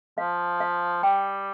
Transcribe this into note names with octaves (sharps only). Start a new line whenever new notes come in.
F3 F5
F5
G3 G5